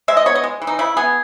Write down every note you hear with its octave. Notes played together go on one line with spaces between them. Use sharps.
G#3 E5
D#5
B3 C#5
D#5
G#3
E3
D#4
C#3 E4
B3 G#4